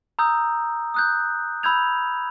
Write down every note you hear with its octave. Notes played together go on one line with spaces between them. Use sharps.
A#5 D#6 E6 G6
D#6 F#6 G6
B5 E6 G6 G#6 F7